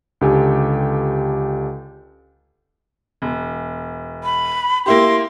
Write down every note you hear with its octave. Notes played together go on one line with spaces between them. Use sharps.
C#2 D3 G4 A4 G#5
E1
B5
A#3 E4 G4 C6